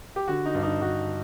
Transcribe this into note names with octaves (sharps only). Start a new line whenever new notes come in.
G4
D3 F#4
D#4
G2
D#4
G2 F#4